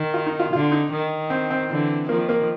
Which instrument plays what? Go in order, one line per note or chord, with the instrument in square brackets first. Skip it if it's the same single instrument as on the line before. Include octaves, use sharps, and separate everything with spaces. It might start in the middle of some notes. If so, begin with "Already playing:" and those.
Already playing: [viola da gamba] D#3
[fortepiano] F4
D#4
F4
[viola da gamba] D3 [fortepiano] F4
[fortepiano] D#4
[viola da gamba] D#3
[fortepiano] C4
C4
[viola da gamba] D3 E3
[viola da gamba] D#3 F3 [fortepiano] A#3
[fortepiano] A#3